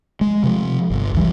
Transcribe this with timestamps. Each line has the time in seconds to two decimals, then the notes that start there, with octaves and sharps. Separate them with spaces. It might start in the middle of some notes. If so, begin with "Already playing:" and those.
0.21 G#3
0.43 C3 F3
0.90 G1
1.14 C#2 F#2 E3 G3